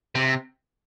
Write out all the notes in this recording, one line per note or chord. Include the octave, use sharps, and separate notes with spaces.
C3